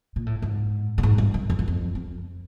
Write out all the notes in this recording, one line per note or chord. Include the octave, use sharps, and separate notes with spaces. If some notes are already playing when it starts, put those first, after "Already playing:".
A#2
A2
G#2
A2
G#2
G2
F#2
F2
F#2
F2
F2